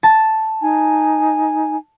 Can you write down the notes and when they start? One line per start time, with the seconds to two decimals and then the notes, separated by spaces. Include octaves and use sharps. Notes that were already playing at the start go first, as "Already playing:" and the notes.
0.03 A5
0.61 D#4 G#5